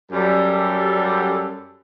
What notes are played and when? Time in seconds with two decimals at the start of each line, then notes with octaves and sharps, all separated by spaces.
0.12 F#2 G3 A4